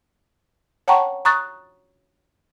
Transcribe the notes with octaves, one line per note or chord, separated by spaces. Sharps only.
C#5 F#5 G5 A5 A#5 C#6
A#5 C#6 D#6 F#6 A6